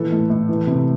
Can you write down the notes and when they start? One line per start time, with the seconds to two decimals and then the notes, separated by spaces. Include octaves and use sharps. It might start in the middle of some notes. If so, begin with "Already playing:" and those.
Already playing: A#2 E3 A4
0.12 A2
0.30 A2
0.49 E3
0.67 C3